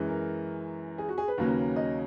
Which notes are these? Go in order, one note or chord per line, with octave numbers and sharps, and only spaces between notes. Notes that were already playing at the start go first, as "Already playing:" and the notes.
Already playing: F#2 E3 G#3
A#4
G#4
F#4
G#4
B4
D#2 C#3 F#3 A#3 C#4
D#5